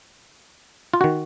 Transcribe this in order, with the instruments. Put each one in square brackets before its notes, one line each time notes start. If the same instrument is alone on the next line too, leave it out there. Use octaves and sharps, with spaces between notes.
[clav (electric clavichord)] F4
D#3 F#4